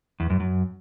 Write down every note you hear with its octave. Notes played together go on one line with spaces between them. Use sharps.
E2
F#2
F#2